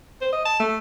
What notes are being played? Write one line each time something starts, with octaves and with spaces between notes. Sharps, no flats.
C5
D#5
A5
A3